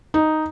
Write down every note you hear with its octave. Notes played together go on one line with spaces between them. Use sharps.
D#4